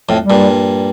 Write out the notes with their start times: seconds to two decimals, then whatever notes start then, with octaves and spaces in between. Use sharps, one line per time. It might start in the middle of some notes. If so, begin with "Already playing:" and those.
0.09 F2 A2
0.22 G3
0.30 G2 A#2